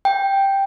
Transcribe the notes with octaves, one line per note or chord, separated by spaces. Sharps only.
G5